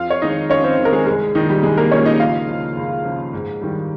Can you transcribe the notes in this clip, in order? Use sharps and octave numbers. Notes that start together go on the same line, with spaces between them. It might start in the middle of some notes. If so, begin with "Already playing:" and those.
Already playing: F2 F4 F5
C#5
D#3 G#3 D#4 D#5
F2 C#4 C#5
C4 C5
D#3 G#3
A#4
G#3 G#4
C2 G#3 G#4
A#2 D#3 F3 D#4
G3 G4
C2 G#3 G#4
A#3 A#4
A#2 F3 C#4 C#5
D#4 D#5
C#2 F4 F5
C#3 F3
C#2
C#3 F3
G#2
D#3 G3